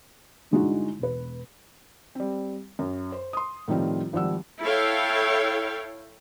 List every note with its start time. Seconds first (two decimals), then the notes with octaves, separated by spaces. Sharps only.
0.51 G2 D3 G#3 D#4 E4 F#4
0.99 E1 B4
2.15 G3 C4
2.79 F#2
3.12 C5
3.33 C6 D#6
3.68 A2 D#3 F3 G3 C4 F4
4.13 G#1 F3 G3 F#5 E6
4.63 E4 A4 C#5 F5 G5